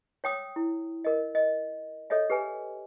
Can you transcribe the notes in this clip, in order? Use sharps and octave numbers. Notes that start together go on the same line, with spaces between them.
C#5 G5 D#6 E6
E4
A#4 D#5
D#5
A4 C#5 D#5 E5
G4 B4 G#5